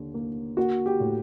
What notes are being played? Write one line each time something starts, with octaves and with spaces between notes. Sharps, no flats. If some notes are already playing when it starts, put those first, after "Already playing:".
Already playing: D#2 D3
A#3
A#3 F#4
G4
A2